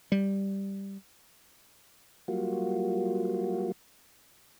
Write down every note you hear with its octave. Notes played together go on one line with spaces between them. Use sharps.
G3
F#3 G3 A#3 F4 F#4